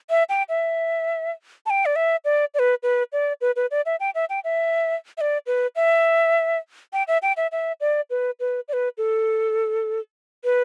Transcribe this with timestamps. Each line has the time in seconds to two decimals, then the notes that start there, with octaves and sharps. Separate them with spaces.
0.10 E5
0.29 G5
0.49 E5
1.66 A5
1.70 G5
1.86 D5
1.96 E5
2.25 D5
2.54 D5
2.59 B4
2.83 B4
3.13 D5
3.41 B4
3.56 B4
3.71 D5
3.86 E5
4.00 G5
4.15 E5
4.30 G5
4.44 E5
5.18 E5
5.21 D5
5.47 B4
5.76 E5
6.93 G5
7.08 E5
7.22 G5
7.37 E5
7.52 E5
7.81 D5
8.10 B4
8.40 B4
8.68 D5
8.73 B4
8.98 A4
10.44 B4